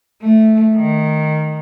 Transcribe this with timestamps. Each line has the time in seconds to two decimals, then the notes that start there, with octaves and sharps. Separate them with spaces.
0.21 A3
0.76 D#3